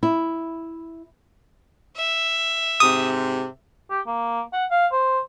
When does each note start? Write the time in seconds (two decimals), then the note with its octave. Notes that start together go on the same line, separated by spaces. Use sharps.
0.03 E4
1.96 E5
2.80 G#2 C3 D#6
3.90 G4
4.07 A#3
4.53 F#5
4.71 F5
4.92 C5